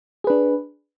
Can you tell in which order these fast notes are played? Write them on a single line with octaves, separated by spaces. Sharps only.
G#4 B4 D4